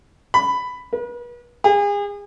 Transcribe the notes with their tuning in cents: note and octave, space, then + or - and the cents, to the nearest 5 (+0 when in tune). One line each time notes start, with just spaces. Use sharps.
B5 +10
B4 -40
G#4 -35